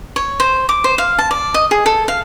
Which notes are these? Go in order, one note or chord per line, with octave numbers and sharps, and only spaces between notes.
C#5
C5
D6
C5
F5
A5
D5
D#5
G#4
A4
F5